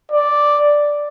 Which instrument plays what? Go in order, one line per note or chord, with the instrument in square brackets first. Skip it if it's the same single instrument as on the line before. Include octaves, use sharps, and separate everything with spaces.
[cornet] D5